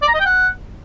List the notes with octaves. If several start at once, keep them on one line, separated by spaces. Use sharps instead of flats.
D5
A#5
D#5
G5
F#5